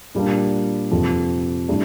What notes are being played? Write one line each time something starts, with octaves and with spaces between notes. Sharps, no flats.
A#2 G3 A#3 D4
F2 C3 F3
A2 G3 D4